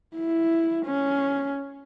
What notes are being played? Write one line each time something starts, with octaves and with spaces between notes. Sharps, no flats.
E4
C#4